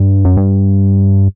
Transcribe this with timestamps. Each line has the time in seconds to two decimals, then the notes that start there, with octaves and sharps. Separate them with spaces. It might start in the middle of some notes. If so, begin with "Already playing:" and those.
Already playing: G2
0.25 F#2
0.37 G2